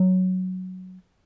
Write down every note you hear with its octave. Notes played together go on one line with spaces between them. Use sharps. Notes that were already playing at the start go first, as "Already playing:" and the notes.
Already playing: F#3